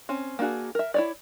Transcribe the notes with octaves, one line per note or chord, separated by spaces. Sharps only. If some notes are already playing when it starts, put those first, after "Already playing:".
C4 C#4
A#3 D4 F#4 G#4
A#4 E5
E4 C#5 D5